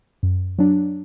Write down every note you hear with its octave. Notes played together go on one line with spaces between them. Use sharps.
F#2
F#3 D4